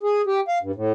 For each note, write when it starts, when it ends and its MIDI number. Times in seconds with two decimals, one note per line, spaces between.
0.03 0.22 68
0.27 0.40 67
0.48 0.58 77
0.62 0.72 43
0.76 0.92 45